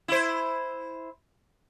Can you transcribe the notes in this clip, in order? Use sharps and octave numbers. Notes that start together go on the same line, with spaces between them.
E4 C5